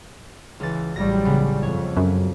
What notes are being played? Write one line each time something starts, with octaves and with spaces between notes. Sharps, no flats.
C#2 E3 A6
A1 F#3 G3 A#6
C#3 B3
F2 C#5
F#2